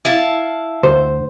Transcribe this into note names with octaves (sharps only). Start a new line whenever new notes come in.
E4 F5 A5
D2 C5